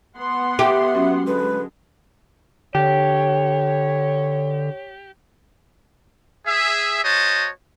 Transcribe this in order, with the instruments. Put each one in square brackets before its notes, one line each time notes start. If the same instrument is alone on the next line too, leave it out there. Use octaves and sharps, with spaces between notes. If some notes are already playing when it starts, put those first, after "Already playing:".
[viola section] B3 F#5 C6
[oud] G4 [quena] E5
[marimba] F#3 C#4 F#4
[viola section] D3 G#3 [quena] B4
[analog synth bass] D3 [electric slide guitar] G4 [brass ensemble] C#5
[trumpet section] G#4 E5
F#4 C5 C#5 D#5 A5